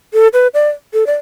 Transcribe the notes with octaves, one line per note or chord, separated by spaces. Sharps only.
A4
B4
D5
A4
D5